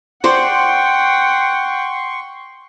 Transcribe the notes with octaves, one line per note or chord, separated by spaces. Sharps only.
C5 D5 F#5 G5 C6 C#6